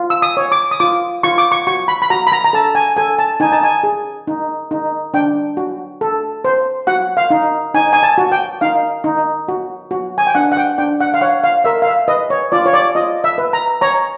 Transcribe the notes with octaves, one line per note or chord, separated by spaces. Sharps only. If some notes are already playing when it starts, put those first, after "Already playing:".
Already playing: F4
E6
D#6
C#5
D6
D#6
F4 D6
F4 C#6
D6
C#6
F#4 C#6
B5
B5
F#4 A#5
B5
A#5
A#5
A4 A5
G#5
A4 G#5
A5
D#4 G#5
A5
G#5
G#4
D#4
D#4
D4 G5
F#4
A4
C5
F#4 F#5
F5
D#4
D#4 G#5
G#5
A5
F#4
G5
D#4 F5
D#4
F#4
F#4
G#5
G5
D4 F#5
F#5
G5
D4 G5
F#5
F5
C#5 F#5
F5
A#4 E5
F5
E5
B4 D#5
C#5
F4 D5
C#5
D5
F4 D#5
E5
B4
A#5
C#5 A#5